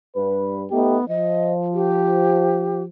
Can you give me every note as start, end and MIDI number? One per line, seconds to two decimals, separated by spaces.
0.16 0.65 43
0.16 0.65 71
0.71 0.97 57
0.71 1.08 59
0.71 0.97 63
0.71 0.97 67
1.09 2.86 53
1.09 1.52 75
1.74 2.83 67